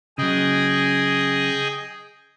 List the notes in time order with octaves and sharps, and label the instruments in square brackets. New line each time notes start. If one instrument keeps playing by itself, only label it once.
[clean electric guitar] C#3 F#3 [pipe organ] G#4 D#5 G5